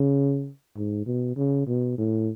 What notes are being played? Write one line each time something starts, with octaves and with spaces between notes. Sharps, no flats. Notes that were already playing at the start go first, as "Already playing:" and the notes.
Already playing: C#3
G#2
B2
C#3
B2
A2